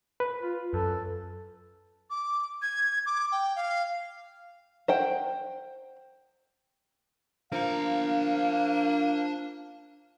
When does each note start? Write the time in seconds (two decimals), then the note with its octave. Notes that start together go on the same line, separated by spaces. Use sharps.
0.20 B4
0.42 F4
0.74 F#2 A4
2.10 D6
2.62 G#6
3.05 D6
3.31 G5
3.55 F5
4.88 C5 F#5 G5
7.52 F3 A#3 D4 F5 A#5